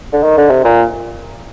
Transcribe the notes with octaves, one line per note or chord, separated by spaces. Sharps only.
D3
D#3
D3
C3
A#2